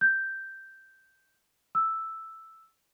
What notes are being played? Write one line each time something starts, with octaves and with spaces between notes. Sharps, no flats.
G6
E6